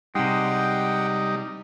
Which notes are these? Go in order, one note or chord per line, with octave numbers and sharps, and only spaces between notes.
C3 G3 G#3 D#4 F#5 G5